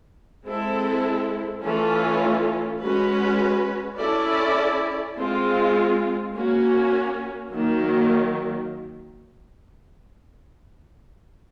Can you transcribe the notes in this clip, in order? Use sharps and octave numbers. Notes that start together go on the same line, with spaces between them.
G#3 C4 E4 A4
E3 A3 C#4 F4 A4
G#3 C#4 F#4 B4
C#4 E4 A4 D5
G#3 C4 F4
A#3 C#4 F#4
D#3 F#3 A#3